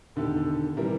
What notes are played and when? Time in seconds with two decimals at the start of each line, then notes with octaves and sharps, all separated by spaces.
0.16 E1 D3 D#3 G4 A4
0.77 C3 D#3 E3 G3 A#4